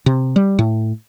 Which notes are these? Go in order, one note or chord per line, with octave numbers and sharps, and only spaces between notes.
C3
G3
A2